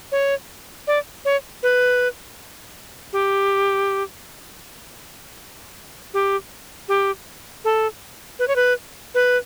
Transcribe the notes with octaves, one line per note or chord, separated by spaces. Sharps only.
C#5
D5
C#5
B4
G4
G4
G4
A4
B4
C#5
B4
B4